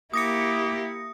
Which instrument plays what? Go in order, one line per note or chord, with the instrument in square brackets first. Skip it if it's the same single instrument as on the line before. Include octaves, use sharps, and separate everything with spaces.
[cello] A#3 G4 [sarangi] E4 [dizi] D6 [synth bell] D#6 A#6 C#7